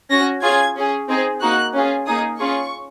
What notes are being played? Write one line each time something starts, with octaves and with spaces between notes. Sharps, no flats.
C#4 F#4 A#6
C#4 F4 G#4 G#6
C#4 G#4
C4 D#4 G#4
A#3 D#4 F#4 F#6
C#4 F4 G#4
A#3 D#4 G#4 D#6
C#4 F4 G#4 C#6